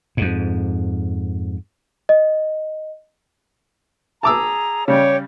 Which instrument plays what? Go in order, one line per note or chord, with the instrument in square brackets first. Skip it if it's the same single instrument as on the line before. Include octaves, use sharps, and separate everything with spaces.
[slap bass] F2 G#2
[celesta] D#5
[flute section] G#4 A#5 [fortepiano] A5 D6 E6
[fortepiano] C#3 G3 [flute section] G4 C#5